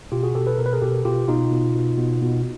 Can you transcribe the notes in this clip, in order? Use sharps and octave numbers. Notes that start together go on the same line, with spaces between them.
B2 F4 G4
F#4 G#4
B2 G4 A4
A4 B4
B2 A#4
B4
G#4 A#4
B2 G4 A4
B2 F4 G4
B2 D#4 F4
B2
B2
B2
B2